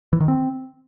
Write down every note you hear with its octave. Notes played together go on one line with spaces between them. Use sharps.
E3
D#3
C4